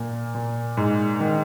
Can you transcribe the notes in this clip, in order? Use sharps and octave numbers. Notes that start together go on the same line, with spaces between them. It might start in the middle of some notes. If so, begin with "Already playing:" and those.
Already playing: A#2 A#3
A#2
G#2
D#3